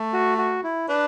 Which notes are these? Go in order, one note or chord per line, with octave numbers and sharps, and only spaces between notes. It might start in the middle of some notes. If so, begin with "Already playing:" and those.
Already playing: A3
F#4
F#4
E4
D4 B4